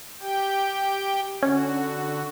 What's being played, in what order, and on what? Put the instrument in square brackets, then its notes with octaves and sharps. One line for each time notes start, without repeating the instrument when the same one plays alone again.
[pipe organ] G4 G5
[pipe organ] D3 F#4 [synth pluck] C#4